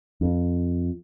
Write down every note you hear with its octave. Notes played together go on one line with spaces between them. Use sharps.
F2